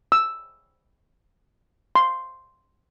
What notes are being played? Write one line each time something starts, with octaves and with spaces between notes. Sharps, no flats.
E6
C6